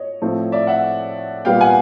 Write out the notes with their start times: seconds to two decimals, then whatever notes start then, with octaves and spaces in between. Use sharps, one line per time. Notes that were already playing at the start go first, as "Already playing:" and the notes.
Already playing: C#5 D#5
0.22 A2 F3 A3 C4
0.52 D5 E5
0.67 E5 F#5
1.45 A#2 G3 B3 F5 G5
1.61 F#5 G#5